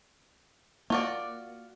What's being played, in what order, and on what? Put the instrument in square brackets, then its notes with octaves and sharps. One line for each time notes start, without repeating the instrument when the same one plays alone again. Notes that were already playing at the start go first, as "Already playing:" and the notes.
[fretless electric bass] A#3 [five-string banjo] F4 F#4 D5